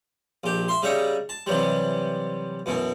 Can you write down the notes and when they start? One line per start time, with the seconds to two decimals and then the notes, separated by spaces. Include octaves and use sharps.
0.44 A#1 G4
0.68 E5 C6
0.82 C#3 G3 D#4 E5 C#6
1.29 A5
1.46 C3 E3 F#3 G3
2.66 F#2 B2 E3